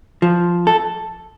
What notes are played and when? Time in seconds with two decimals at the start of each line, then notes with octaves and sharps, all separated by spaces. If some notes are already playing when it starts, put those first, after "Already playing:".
0.22 F3
0.67 A4